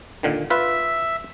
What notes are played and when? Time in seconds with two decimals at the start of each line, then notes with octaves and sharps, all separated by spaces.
0.23 A#2 D3 D#3
0.50 F4 B4 E5